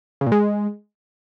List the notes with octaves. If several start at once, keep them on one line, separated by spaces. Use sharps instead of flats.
C#3
A#2
G#3